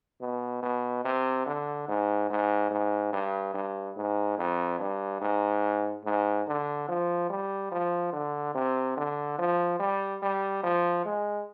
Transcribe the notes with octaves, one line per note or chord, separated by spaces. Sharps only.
B2
B2
C3
D3
G#2
G#2
G#2
G2
G2
G#2
F2
G2
G#2
G#2
D3
F3
G3
F3
D3
C3
D3
F3
G3
G3
F3
G#3